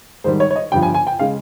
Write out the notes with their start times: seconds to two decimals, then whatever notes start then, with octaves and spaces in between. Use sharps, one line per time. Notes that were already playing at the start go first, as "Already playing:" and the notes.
0.24 G#2 D#3 G3 C5
0.40 C#5
0.51 C#5
0.56 D#5
0.72 G1 G2 F3 G5
0.83 G#5
0.94 G#5
1.07 G5
1.19 C#3 G#3 F5